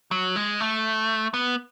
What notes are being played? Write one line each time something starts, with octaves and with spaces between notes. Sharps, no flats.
F#3
G#3
A3
B3